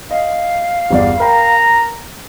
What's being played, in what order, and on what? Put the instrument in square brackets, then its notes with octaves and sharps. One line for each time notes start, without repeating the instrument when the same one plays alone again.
[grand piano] D#5 [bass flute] F5
[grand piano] G1 E2 D5
[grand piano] A#4 G5 B5 [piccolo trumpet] A#5